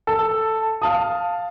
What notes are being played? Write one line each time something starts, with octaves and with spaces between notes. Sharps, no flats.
A4
F5 A5 D#6